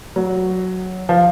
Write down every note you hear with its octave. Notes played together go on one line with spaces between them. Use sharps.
F#3
F3